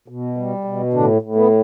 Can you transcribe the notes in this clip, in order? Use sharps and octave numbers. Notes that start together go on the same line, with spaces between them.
B2
G3
B2
A2 D3 D4
A2
B3